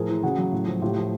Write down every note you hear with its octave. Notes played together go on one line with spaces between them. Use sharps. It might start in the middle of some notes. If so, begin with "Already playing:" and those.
Already playing: A2 F3 G#4 A#4
E3
C#3 F#4 G#4
F#3
A2
F3
A2 F4 G4
F3